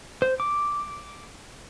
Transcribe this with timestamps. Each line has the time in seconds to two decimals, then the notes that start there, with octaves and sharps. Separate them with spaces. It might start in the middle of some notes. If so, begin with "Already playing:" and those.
0.22 C5
0.40 D6